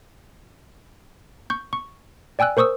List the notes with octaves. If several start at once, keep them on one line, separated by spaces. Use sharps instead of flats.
C#6 G6
C#6
D5 G5 G#5 E6 F#6
A#4 C5 C#6 D#6 E6